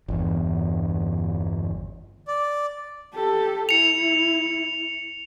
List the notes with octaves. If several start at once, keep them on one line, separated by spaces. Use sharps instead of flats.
G1 E2
D5
G4 A4
E4 C#7 F7